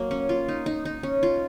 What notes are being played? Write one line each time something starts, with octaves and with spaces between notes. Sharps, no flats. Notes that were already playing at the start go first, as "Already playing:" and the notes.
Already playing: F#3 A#3
C#4
F4
D#4
D#4
D#4
C#4
F4